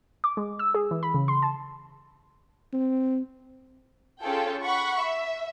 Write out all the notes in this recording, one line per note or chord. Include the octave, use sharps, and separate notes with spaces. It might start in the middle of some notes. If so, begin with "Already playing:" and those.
D6
G#3
E6
G#4
E3
B5
C#3
C6
A5
C4
C#4 F4 G#4 A4 G5
F#5 B5 C#6
E5